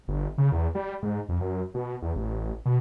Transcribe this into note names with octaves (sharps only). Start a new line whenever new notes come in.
G1
C#3
E2
G3
G#2
F2
F#2
B2
E2
A1
B2